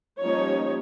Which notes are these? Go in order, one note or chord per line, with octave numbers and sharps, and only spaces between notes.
F3 G3 A#3 C#4 D#4 C#5